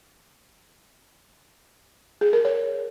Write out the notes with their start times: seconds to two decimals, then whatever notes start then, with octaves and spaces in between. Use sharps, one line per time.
2.21 G#4
2.33 A#4
2.45 C#5